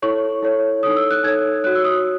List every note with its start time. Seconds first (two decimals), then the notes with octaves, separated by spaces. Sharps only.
0.02 E4 A4 C#5 C#6
0.42 E4 A4 C#5
0.83 D#4 A4 C#5 D#6
0.96 E6
1.11 F#6
1.24 D#4 A4 C#5 G#6
1.64 F#4 C#5 F#6
1.75 E6
1.84 D#6